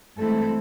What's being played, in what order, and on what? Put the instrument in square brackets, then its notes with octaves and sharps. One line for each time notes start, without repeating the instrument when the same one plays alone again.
[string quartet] G2 E3 G#3 A3 C4 E4 A4